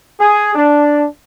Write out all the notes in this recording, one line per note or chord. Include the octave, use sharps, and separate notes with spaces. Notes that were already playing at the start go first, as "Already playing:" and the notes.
G#4
D4